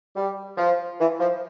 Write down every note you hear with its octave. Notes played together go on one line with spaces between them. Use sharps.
G3
F3
E3
F3